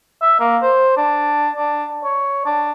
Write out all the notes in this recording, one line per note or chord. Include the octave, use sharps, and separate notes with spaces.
E5
A#3
C5
D4
D4
C#5
D4